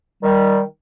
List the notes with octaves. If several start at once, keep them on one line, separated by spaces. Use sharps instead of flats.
D#3 G3